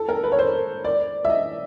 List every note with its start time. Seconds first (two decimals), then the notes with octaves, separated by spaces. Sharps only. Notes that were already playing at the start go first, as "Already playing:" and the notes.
Already playing: A4
0.09 A#4
0.23 B4
0.32 C#5
0.39 C5
0.84 D5
1.25 E5
1.30 D#5